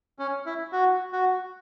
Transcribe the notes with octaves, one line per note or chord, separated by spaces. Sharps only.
C#4
E4
F#4
F#4